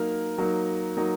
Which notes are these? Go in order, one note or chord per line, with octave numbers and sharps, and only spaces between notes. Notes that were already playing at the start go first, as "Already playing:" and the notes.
Already playing: F#3 A#3 D#4 F6
F#3 A#3 D#4
F#3 A#3 D#4